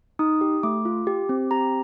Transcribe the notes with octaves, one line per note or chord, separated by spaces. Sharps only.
D#4 D#6
G4
A3 D6
F4
G4
C4
G4 A#5